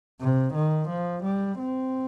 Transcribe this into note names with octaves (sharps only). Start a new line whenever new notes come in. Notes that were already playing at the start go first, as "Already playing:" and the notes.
C3
D#3
F3
G3
C4